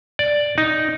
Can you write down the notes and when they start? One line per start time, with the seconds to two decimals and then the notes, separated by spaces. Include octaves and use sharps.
0.19 D5
0.58 D#4